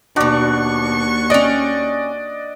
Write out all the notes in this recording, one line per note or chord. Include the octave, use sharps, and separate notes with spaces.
D#2 B2 D4 F#4 D5 C#6
C#4 D5 D#5 G5